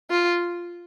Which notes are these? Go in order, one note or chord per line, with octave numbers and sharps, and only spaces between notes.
F4